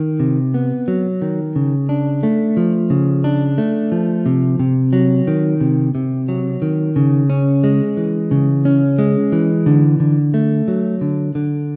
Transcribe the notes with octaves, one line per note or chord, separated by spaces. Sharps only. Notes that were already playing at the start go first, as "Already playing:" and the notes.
Already playing: D#3
C3
B3
F#3
D#3
C#3
D4
A3
F3
C#3
D4
A3
F3
C3
C3
F#3
D#3
C3
C3
F#3
D#3
C#3
C#4
G#3
E3
C#3
C#4
G#3
E3
D3
D3
A3
F#3
D3
D3